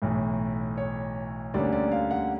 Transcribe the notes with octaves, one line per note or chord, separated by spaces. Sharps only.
B1 A2 E3
C#5
D2 D3 G3 A#3 C#4 D5
D5
F5
F#5